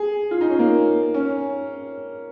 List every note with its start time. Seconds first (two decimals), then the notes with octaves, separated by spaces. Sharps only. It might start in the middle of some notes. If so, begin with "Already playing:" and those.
Already playing: G#4
0.31 F4
0.41 D#4
0.50 C#4
0.59 A#3
1.14 C#4